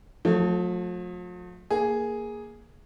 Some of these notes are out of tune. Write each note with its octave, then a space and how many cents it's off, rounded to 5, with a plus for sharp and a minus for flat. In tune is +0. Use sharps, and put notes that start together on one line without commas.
F3 +45 A3 +0
A#3 +0 G#4 +0